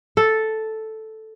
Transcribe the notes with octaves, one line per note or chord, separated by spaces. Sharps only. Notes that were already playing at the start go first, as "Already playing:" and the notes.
A4